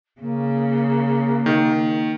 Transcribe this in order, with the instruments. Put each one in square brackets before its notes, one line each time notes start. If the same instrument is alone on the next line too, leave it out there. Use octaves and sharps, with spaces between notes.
[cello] C#3 [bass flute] A#3
[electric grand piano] D#3